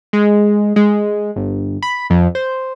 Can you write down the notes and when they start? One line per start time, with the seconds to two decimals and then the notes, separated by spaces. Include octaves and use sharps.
0.13 G#3
0.76 G#3
1.36 G1
1.83 B5
2.10 F2
2.35 C5